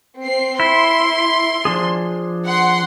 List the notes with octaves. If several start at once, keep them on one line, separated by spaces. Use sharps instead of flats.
C4 C7
E4 C6
F3 D4 G#4
F#5 C6